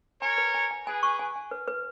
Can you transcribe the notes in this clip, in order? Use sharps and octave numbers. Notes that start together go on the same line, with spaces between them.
A#4 C#5 G#5
B4
G#5
G#5
G#4 B4 G#5
C#6
G#5
G#5
B4
B4